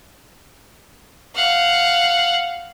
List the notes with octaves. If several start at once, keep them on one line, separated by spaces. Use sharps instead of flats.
F5 F#5